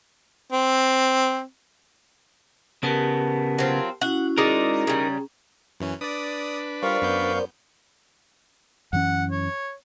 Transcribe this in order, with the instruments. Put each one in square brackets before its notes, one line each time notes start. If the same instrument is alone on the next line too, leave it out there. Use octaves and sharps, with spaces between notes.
[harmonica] C4
[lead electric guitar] C#3 B3 [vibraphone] G4 A#4 A5
[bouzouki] F#3 C4 F4
[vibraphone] C#4 E4 F#4 [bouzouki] F#5
[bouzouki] G#3 D5 [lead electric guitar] D#4 A#4
[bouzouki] C#3 G3 [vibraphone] C#4 G#4 A#5
[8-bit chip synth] F#2 E3 C#4
[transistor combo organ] D4 B4 [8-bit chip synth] D5 D#6
[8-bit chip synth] G3 F4 [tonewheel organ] A#4 C5 D5 [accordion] F5 C#6
[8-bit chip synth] F#2 B3 G6
[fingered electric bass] F#2 E3 C#4 [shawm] F#5
[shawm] C#5